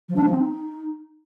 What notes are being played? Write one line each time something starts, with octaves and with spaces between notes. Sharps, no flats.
F3
D4
F3
C4
D#4